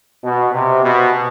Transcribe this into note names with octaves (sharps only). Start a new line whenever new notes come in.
B2
C3
B2